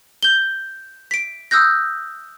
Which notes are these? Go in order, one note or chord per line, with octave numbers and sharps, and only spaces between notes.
G6 G7
B6 D7
D#6 E6 F#6 G6 A#6